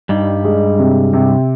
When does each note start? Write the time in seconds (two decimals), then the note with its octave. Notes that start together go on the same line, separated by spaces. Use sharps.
0.09 G2 G3 D#4
0.44 G#3
0.79 C3
1.13 C3